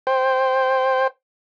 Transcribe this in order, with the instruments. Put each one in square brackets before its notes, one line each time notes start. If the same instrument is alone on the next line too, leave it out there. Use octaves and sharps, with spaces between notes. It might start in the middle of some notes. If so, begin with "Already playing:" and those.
[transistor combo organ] C5 G5